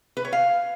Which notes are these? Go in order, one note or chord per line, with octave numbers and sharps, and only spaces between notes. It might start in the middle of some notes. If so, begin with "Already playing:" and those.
B4
C#5
F5